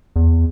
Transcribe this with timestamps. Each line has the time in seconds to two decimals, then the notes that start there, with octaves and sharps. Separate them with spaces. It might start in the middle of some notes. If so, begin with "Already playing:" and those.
0.16 E2